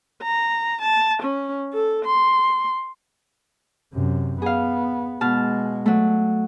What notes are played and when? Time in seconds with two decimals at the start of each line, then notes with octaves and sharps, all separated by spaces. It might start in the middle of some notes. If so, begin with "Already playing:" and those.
0.23 A#5
0.81 A5
1.23 C#4
1.74 A4
2.05 C6
3.93 F#2 C3
4.42 B3 G#4 F5
5.21 B2 G#3 A5 F6
5.86 F#3 A3